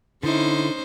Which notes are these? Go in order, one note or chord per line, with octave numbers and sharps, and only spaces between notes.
D3 C#4 D#4 E4 C5